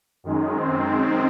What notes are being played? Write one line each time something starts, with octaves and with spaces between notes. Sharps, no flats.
F#2 D#3 G#3
C4